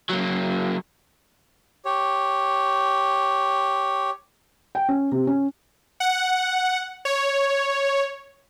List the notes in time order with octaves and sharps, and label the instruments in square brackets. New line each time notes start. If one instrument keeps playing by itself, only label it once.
[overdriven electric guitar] F#3 A#3
[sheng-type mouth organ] G4 C#5
[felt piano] G5
C#4
C3
C#4
[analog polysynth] F#5
C#5